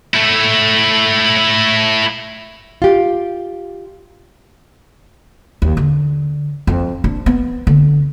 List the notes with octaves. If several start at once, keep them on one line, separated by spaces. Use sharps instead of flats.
A3 E4
F4 G4
D#2
D3
F2
D4
B3
D3